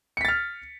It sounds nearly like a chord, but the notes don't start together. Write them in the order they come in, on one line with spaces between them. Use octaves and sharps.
C#7 B6 A6 F6